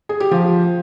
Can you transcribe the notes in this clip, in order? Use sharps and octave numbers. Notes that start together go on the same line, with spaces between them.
G#4
G4
F3